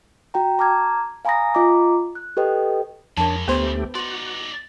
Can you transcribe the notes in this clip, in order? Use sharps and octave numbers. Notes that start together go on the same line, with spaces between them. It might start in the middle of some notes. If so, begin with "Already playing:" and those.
F#4 G5 A#5
A5 A#5 D6 F6 G#6
F5 G#5 A#5 B5 D#6 A#6
F4 D#5 A#5 D6
F#6
G4 A4 B4 D#5 G5
F2 C#3 G#3 D4 A#4 C#5 A5
D2 A3 B3 G4 B4 C5 C6
D#4 F#4 D5 C6